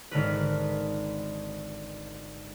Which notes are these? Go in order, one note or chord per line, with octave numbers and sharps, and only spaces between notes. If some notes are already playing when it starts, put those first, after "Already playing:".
G#1 D3 A#4 B4